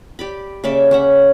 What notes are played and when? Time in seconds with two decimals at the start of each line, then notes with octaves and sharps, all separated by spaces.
0.19 G4 D5 B5
0.64 C#3 A#3 D5 E5
0.91 C#4 E5 F#5